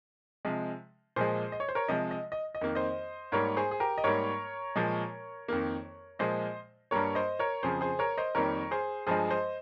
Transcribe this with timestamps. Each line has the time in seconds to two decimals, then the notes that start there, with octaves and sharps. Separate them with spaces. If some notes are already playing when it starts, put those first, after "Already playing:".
0.45 C3 F3 G#3
1.16 A#2 F3 G#3 G#4 C5
1.52 D#5
1.60 C#5
1.69 C5
1.75 A#4 C#5
1.88 C3 F3 G#3 D#5
2.11 D#5
2.32 D#5
2.55 D#5
2.61 F2 D#3 A#3
2.75 C5 D#5
3.32 G#2 G3 A#3 A#4 C#5
3.57 G#4 C5
3.71 G#4
3.80 G4 A#4
3.98 D#5
4.04 G#2 G3 A#3 A#4 C#5
4.76 A#2 F3 G#3
5.48 F2 D#3 A#3
6.19 A#2 F3 G#3 C5 D#5
6.91 G2 G3 A#3 A#4 C#5
7.15 C5 D#5
7.39 A#4 C#5
7.63 F2 C#3 F3 G#4 C5
7.81 G#4 C5
7.99 A#4 C#5
8.18 C5 D#5
8.35 F2 D#3 G3 A#3 A#4 C#5
8.71 G#4 C5
9.07 G2 F3 G#3 G#4 C5
9.31 C5 D#5